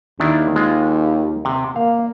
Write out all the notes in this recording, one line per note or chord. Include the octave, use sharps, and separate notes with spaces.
D#2 D#3 D4 E4
G#3 F4
C3
A#3 F5